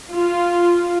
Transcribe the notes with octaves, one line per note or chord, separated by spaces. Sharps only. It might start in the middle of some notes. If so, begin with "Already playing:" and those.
F4